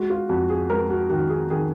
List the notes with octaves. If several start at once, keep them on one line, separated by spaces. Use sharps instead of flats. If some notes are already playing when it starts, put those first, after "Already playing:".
Already playing: G#3 F#4
F4
F2 F#4
G#4
G#3 A#4
F#4
D#3 F#4
G#4
D#3 G#4